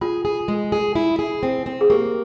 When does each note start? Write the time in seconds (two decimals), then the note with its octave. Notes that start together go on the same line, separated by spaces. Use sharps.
0.01 F4 G#4
0.25 G#4
0.48 G#3
0.72 G#4
0.95 E4
1.19 G#4
1.43 C4
1.66 C4
1.81 G#4
1.90 A#3 G4